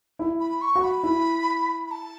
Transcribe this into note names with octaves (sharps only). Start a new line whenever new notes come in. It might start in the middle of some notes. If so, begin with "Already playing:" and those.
E4
B5
C#6
F#4
B5
E4
B5
A5